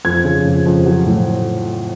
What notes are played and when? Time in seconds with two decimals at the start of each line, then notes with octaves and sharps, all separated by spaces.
0.05 F2 G#6
0.25 C#3
0.45 F2
0.65 F2
0.86 F#3
1.06 A2